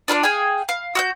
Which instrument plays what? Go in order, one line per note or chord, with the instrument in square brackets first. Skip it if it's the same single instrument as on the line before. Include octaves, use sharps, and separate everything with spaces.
[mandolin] D4 F4 A4 D5
G#4 F5 G5 G#5
F5
F#4 F#6 G6